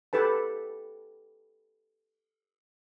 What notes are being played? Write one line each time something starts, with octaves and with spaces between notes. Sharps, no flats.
G4 A4 B4 A5